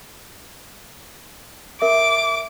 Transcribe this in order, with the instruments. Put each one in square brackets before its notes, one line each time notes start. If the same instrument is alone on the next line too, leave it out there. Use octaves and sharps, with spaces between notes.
[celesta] A#4 E5 [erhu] D6